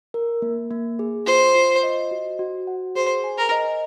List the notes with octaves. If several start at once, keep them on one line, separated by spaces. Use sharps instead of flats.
A#4
A#3
A#3
G#4
F4 C5
F4
D#5
F#4
F#4
F#5
G#4 C5
G#5
A#4
D#5